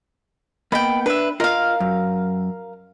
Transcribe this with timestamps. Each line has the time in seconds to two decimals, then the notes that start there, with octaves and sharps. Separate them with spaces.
0.72 A#3 B3 D#5 G5 B5
1.06 D4 B4 E5
1.40 F4 A#4 D#5 F5
1.80 F#2